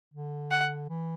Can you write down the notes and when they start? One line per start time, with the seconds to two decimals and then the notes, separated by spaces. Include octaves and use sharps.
0.14 D3
0.51 F#5
0.89 E3